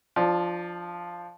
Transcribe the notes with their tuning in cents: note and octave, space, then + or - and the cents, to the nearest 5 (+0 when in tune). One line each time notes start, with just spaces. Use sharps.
F3 +0 D4 +15